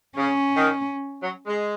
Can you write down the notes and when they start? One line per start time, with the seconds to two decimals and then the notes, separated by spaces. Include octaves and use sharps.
0.16 C#3 C#4
0.55 D#3
1.21 F#3
1.45 G#3